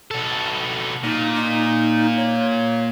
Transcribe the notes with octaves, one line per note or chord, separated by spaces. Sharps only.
B2 A4
A#2 D#4
D#4
C#5